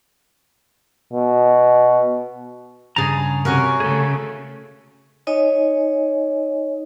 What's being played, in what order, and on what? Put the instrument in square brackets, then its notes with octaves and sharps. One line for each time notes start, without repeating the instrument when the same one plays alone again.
[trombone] B2
[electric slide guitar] G2 C#3 A#5 [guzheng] G#4 A5
[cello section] C3 [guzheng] C#4 F#4 A#4
[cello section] C#3 A3 [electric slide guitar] G#4 A4
[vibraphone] D#4 C#5 D#5 G#5